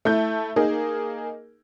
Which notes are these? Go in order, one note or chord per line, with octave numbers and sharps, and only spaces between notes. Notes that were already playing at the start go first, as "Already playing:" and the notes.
A3 E4 G6
A#3 D#4 G#4 A#4